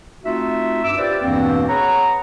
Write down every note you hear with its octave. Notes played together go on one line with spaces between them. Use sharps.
A3 C4 D#4 F4 F#4 E5
G2 D6 E6
F4 G4 B4 C5 D5
E2 G2 B2 E3 A#3 C4
G#4 B4 C#5 F#5 A#5